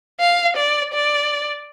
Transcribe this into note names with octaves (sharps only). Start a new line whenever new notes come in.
F5
D5
D5